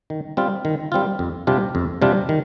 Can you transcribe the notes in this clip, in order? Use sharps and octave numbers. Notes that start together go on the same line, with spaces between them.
D#3
G3 C4 F4
D#3
G3 C4 F4
F2
C3 G3 D4 F4
F2
C3 G3 D4 F4
D#3